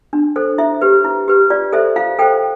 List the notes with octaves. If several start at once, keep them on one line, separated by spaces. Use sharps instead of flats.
D4
A4 C5
E4 E5
G4 B4
E4
G4 B4
F4 D5
A4 C5 E5
F4 F5
A4 C5 G5